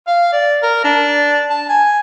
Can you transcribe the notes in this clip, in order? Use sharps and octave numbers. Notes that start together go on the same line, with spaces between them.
F5
D5
A#4
D4
A5
G#5